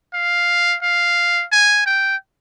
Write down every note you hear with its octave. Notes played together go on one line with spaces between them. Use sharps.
F5
F5
G#5
G5